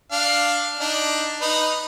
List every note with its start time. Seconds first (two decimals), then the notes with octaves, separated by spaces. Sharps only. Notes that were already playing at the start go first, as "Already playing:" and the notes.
0.12 D4 F5
0.80 D4 D#4
1.41 D#4 B4